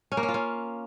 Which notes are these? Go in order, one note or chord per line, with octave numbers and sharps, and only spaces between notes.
C#4
A#3
C#4
F4
C#4